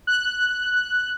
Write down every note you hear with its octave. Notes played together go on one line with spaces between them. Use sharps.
F#6